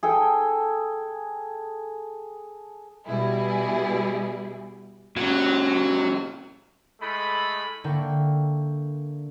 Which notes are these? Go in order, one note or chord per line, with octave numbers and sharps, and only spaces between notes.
G#4 A4 G5
B2 G3 E4 G#4
A#2 C#3 F#3
A2 G#3 A3 B5
D3 A#3 E4 A#4 G5 C#6